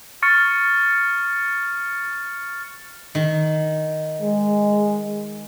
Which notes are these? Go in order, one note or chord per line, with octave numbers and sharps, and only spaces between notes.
C#6 F6 A6 C#7
D#3
G#3